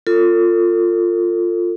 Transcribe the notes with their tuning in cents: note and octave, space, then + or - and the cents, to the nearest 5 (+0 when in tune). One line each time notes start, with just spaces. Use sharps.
F4 +0 A4 +35